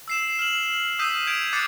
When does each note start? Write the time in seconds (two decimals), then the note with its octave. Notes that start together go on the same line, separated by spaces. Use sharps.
0.08 E6 C7 E7
0.39 F6 E7 F#7
0.99 D#6 E6 G6 B6 D#7
1.27 E6 G6 G#6 D7 F7
1.53 D6 E6 F#6 A6 C7 C#7